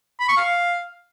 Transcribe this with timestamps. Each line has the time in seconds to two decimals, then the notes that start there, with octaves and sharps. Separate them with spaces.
0.20 B5
0.29 C#6
0.37 F5